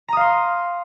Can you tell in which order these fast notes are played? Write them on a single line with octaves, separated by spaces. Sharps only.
A#5 D#6 F5 C6